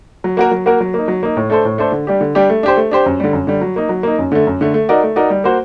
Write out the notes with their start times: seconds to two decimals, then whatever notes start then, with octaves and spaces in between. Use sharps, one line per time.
0.24 F#3
0.37 A#3 F#4 A#4
0.51 F#3
0.66 A#3 F#4 A#4
0.81 F#3
0.94 A#3 D#4
1.08 F#3
1.23 A#3 D#4
1.37 A2
1.50 A3 D4 A4 C5
1.65 A2
1.78 A3 D4 A4 C5
1.92 D3
2.07 G3 D4 G4
2.21 D3
2.35 G3 D4 G4
2.50 A3
2.63 D4 G4 C5
2.77 A3
2.91 D4 G4 C5
3.06 F#2
3.20 D3 G3
3.33 F#2
3.47 D3 G3
3.61 F#3
3.76 A#3 D#4
3.89 F#3
4.03 A#3 D#4
4.19 F#2
4.32 D3 A3
4.47 F#2
4.61 D3 A3
4.74 A3
4.89 D#4 F#4 A#4 D5
5.03 A3
5.16 D#4 F#4 A#4 D5
5.30 G3
5.44 A#3 F#4 C5